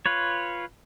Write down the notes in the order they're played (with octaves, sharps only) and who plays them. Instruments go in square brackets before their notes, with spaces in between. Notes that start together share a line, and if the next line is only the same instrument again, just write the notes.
[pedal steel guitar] F4 B4 C#5